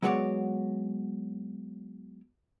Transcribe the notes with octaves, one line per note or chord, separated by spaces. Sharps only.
F#3 G#3 B3 F#4 C#5 D5